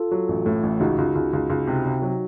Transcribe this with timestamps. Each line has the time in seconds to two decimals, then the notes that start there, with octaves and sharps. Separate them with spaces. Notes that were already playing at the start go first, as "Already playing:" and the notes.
Already playing: F4 A4
0.11 F#3
0.28 A1
0.46 A2
0.63 A1
0.80 C#2 D#4 F#4
0.98 C#2
1.15 C#2
1.33 C#2
1.50 C#2
1.67 C3
1.85 C3
2.02 F#3